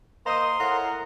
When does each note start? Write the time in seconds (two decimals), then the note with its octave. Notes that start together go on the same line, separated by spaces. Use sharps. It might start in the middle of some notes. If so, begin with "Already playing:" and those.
0.26 A#3 C5 D#5 A#5 C6 D#6
0.60 A2 E4 A#4 F#5